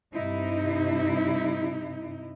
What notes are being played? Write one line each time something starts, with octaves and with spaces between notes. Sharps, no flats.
G2 C3 D#4 E4